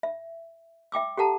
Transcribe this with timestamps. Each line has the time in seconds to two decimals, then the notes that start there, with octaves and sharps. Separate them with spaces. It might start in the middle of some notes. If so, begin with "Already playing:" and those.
0.03 E5
0.92 E5 G5 D6 E6
1.17 G4 A4 F#5 A5 A#5